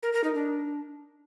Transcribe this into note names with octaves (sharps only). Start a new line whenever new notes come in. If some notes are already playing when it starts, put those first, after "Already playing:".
A#4
A#4
D#4
D4